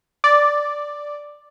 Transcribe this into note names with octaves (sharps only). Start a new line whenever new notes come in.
D5